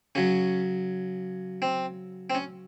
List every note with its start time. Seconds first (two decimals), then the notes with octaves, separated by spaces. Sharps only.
0.15 C#3 F#3 C#4
1.62 C4
2.30 C4
2.35 C#4